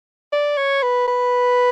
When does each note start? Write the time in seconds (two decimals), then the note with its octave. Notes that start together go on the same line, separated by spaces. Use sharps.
0.32 D5
0.57 C#5
0.82 B4
1.08 B4